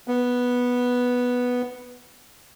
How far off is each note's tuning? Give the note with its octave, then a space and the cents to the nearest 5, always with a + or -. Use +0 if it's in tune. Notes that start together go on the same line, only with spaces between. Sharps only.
B3 -5